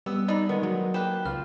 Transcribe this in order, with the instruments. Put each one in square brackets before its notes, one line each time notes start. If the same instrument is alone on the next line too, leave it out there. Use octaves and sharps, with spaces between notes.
[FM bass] G3 [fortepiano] B3 E6
[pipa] D4 D#4 [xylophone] D5 B5
[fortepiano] D#3 G#3 A#3 [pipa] B3 [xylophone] B4
[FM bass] F#3
[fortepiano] A#3 B4 [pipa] G4 [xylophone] F#6 E7
[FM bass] C#2 [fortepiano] F4 B4 [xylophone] F6